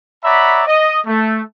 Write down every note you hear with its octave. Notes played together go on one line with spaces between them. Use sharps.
C#5 D5 E5 F#5 A#5 B5
D#5
A3